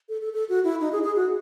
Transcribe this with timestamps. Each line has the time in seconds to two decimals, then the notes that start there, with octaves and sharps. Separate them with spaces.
0.09 A4
0.21 A4
0.33 A4
0.49 F#4
0.64 E4
0.81 D#4
0.92 G#4
1.03 G#4
1.16 F#4